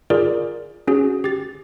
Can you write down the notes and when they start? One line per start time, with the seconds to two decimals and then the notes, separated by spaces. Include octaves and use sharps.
0.10 F4 G#4 A#4 D5
0.87 C#4 F#4 G#4
1.24 G4 A6